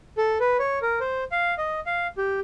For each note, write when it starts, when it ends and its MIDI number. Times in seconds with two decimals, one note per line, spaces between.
0.18 0.38 69
0.40 0.57 71
0.59 0.79 73
0.82 0.99 70
1.00 1.24 72
1.32 1.54 77
1.58 1.80 75
1.86 2.07 77
2.18 2.40 67